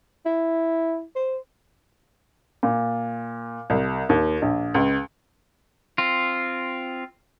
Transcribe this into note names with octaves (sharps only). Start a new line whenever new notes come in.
E4
C5
A#2
C2
D#2
A#1
C#2
C4 F4